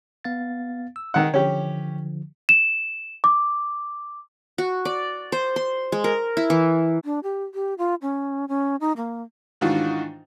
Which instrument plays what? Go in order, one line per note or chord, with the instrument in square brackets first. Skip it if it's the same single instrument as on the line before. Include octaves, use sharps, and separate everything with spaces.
[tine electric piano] B3 F5 A6
E6
[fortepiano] D#3 F#5
[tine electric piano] D3 F3 [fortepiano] C#4 G4
[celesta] E7
D6
[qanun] F#4
D5
C5
C6
G#3
A#4
E4
E3
[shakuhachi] D4
G4
G4
F4
C#4
C#4
D#4
A#3
[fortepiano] G#2 D#3 E3 D4 F4 F#4